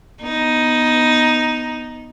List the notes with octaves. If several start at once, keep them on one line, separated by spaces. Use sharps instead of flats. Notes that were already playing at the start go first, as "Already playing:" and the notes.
B3 D#4